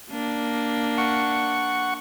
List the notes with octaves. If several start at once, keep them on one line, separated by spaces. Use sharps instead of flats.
A#3 D4
F#5 C#6